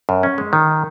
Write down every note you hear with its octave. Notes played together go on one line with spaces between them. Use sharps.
F#2
C#4
G#3
D#3